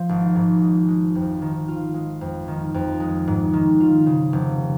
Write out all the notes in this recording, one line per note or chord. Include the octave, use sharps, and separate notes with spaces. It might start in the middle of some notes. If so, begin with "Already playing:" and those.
Already playing: F3
G#1
G#2
G#3
G#3
F2
D#3
F4
G#3
F2
D#3
F2
G#3
G#2
D#3
F4
C#3
F1